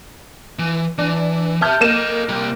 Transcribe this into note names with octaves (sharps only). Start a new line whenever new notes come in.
E3
E3 D4
G4 E5 A5 F6 G6
A#3 A4 D#5 D#7 E7
C3 G3